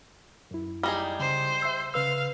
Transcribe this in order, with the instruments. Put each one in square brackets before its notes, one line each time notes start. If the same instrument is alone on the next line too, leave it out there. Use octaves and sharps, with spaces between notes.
[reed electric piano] F#2 E4
[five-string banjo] G3 D#4 G#4
[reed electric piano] C2 C#3 [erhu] C5
[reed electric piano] E5 E6
[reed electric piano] C#3 B4 E6 [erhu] F5